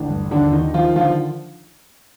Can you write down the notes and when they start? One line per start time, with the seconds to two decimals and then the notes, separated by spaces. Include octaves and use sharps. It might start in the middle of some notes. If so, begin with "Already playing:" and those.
Already playing: A1 D3 D4
0.10 G2
0.31 D#2 D3 D4
0.52 D#3 D#4
0.74 D#3 F3 F4
0.96 D3 F3 F4